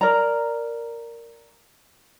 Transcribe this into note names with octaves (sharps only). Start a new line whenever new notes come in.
A#4 D5 A#5